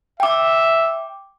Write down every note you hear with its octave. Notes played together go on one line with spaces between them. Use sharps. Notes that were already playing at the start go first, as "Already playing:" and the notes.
E5 G5 D6